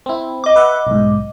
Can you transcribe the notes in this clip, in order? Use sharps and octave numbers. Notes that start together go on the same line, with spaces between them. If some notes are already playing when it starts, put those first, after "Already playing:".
C4 E4
D#5 D6
B4 E5 F#5
B1 G#2